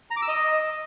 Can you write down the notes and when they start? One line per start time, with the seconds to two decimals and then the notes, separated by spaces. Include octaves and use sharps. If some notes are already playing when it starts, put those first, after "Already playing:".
0.11 A#5
0.16 D6
0.22 E6
0.28 D#5